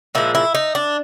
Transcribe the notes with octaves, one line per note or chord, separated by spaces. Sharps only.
A#2 F3 G#3 E4
E4
D#4
D4